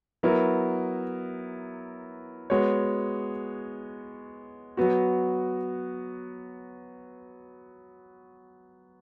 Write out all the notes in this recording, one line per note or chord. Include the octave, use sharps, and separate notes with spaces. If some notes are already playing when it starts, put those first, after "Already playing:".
F#3 B3 E4 A#4
G#3 B3 F#4 C#5
F#3 B3 F#4